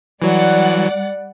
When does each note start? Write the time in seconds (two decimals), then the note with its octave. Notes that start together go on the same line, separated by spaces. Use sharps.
0.22 E3 F#3 G3 D5 F#5